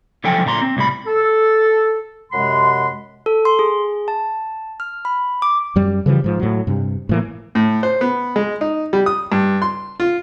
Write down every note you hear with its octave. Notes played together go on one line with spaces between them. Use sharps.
D3 F3 F#3 A4 G5 G#5
A#2 D3 A#5 C6
C4
C2 A2 G3 B5
A4
F#2 C3 G#3 F#5 B5 C6
A4
C6
G#4
A5
F6
B5
D6
F#2 G3
C#3 E3 F3 G3
G#2 F3
A2 F#3
G2 C3
A2 E3 A#3
A2
C5
B3
G#3
D#4
G3
D#6
G2
C6
F4